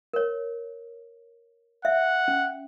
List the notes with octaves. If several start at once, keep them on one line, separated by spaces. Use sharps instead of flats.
A#4 C#5
E5 F#5
C#4